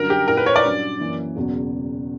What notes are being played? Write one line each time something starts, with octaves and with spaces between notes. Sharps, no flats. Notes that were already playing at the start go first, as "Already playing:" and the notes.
Already playing: G2 D3 F#3 C#4 A#4
G4
A#2 A#3 E4 A#4
B4
C#5
D5
G2 F#3 C#4
F#2 E3 A#3
E1 E2 C#3 F#3